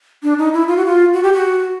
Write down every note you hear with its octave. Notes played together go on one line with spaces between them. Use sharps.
D4
D#4
E4
F4
F#4
F4
F#4
G4
F#4